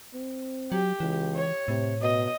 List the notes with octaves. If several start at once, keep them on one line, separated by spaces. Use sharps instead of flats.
C4
F#3 G4
C#2 E3
C#5
A2 C3
B2 D#5